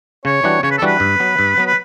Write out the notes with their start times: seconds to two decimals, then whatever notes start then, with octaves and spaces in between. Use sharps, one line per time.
0.25 C#3 C#5
0.44 E3 G3 D4 F#4
0.63 C#3 C#5
0.71 B4
0.78 A4
0.82 E3 G3 D4 F#4 B4
1.00 G2
1.20 F#3 B3
1.39 G2
1.57 F#3 B3
1.66 B4